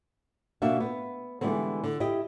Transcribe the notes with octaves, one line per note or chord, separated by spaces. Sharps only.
B2 A#3 D4 F#4 E5
B3
D3 E3 G3 G#3 B3 C4
D3
E4 G4 D#5